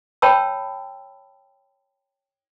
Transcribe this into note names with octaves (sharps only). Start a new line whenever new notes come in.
C#5 G5 A5 B5 E6